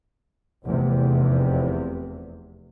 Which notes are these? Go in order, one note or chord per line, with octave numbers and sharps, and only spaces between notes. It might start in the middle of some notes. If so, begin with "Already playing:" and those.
F1 E2 C3